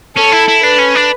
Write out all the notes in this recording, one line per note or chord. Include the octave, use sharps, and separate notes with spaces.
C#4 A4
E4
E4
D4 B4
C#4
D4